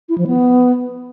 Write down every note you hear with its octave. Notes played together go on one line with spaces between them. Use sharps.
E4
F3
B3